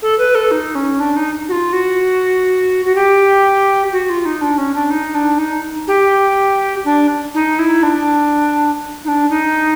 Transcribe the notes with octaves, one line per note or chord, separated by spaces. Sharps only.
A4
B4
A4
D#4
C#4
D4
D#4
F#4
F4
F#4
F#4
G4
F#4
F4
D#4
D4
C#4
D4
D#4
D4
D#4
G4
D4
D#4
E4
D4
D#4
D4
D#4